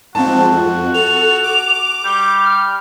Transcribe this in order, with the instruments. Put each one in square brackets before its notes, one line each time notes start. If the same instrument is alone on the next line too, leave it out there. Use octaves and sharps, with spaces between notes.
[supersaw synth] G#2 F3 C4 [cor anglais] F#4 [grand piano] A5
[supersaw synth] F2
[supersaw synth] A4 [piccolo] F7
[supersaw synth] D6
[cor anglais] G3 [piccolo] G6
[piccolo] F6